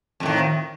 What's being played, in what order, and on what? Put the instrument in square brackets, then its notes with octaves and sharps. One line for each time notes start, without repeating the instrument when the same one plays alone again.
[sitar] F2
A2
D#3